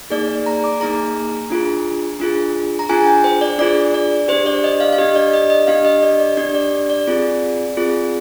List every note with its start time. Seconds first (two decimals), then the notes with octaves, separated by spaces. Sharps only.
0.10 A#3 D#4 G#4 D5
0.28 D5
0.46 A#5
0.64 D6
0.80 A#3 D#4 G#4 A#5
1.50 D4 F4 G#4
2.20 D4 F4 G#4
2.79 A#5
2.89 D4 F4 G#4 G#5
3.07 G5
3.24 C5
3.41 D5
3.58 D4 F4 G#4 D5
3.94 D5
4.28 D4 G4 C5
4.46 D5
4.64 D#5
4.80 F5
4.93 F5
4.98 D4 G4 D#5
5.15 D5
5.33 D#5
5.50 D#5
5.67 D4 G4 F5
5.85 D#5
6.03 D5
6.19 D5
6.37 D4 G4 D5
6.55 D5
6.90 D5
7.07 C4 F4 G#4
7.77 C4 F4 G#4